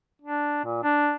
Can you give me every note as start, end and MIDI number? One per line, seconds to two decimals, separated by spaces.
0.22 0.62 62
0.65 0.82 46
0.83 1.15 62